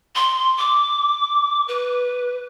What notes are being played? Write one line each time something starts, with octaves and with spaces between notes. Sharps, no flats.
C6
D6
B4